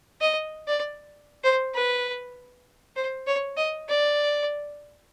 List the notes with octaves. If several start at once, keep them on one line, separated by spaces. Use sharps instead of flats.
D#5
D5
C5
B4
C5
C#5
D#5
D5